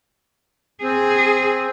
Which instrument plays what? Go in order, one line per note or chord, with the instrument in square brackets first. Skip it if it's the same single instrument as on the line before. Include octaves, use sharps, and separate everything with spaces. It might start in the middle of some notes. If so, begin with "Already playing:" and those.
[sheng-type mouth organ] C4 [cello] G#4